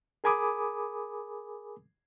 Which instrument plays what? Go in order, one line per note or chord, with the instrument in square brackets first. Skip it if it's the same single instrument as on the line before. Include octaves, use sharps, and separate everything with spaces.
[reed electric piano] G#4 A#4 G#5 B5 D6 D#6